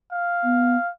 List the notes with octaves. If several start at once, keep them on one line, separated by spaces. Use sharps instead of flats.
F5
B3